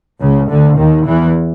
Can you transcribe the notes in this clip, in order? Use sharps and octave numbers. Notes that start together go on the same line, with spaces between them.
C#2 C#3
D2 D3
D#2 D#3
E2 E3